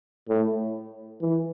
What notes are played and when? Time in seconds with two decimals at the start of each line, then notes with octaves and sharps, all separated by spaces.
0.29 A2
1.21 E3